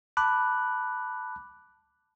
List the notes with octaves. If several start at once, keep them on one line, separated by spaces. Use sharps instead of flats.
A5 B5 D6 F#6